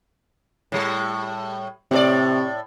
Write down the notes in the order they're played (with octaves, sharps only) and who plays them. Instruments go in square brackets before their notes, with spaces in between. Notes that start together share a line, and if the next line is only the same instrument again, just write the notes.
[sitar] A2 G3
[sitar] A2 G#4 D5 [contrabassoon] C3